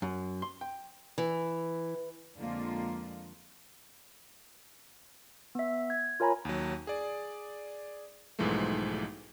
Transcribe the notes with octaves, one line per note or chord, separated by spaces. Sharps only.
F#2
C6
G5
E3
F2 D3 F3 G#3 A#3 F4
B3 E5
G#6
F4 A#4 C#5 G#5 A#5 B5
D#2 F#3
G#4 D5
B1 G#2 E3 F3 G#3 A3